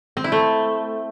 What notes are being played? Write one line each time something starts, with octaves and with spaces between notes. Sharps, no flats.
C4
E4
A3